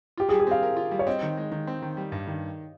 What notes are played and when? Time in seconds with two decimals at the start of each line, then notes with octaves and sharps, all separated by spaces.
0.17 F4 G4
0.29 G#4
0.32 G3
0.40 G#4
0.47 C4 F5
0.63 A#4
0.77 F4
0.92 G3
0.99 C#5
1.07 C4 D#5
1.23 D#3
1.37 G#3
1.52 D#3
1.67 C4
1.82 D#3
1.97 G3
2.12 G2
2.27 D#3